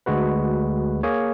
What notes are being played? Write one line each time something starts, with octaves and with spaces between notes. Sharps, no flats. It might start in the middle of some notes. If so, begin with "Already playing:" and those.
D2 G#3 F#4 B4
A#3 G#4 C#5